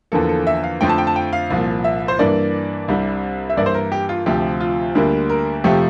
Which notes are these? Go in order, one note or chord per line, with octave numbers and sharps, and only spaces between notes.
E2 D3 F3 A#3 A4
A4
E5
F5
F2 D3 F3 A3 G5
A5
G5
A5
G5
F5
C2 A#2 F3
E5
C5
G2 E3 A#3 D4 D5
C2 C3 G3 D4
E5
G2 E3 A#3 E4 D5
C5
A#4
G4
F4
D2 C3 F3 G4
F4
D2 D3 G3 A#3
A#4
F2 C3 F3 A3 G4